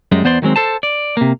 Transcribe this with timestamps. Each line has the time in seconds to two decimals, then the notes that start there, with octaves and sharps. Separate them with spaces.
0.12 F#2 G3 G#3
0.24 E2 B3 C5 D5 C6
0.42 D#3 F#3 G#3 C4
0.56 A4 C5 A5
0.83 D5
1.17 C3 A#3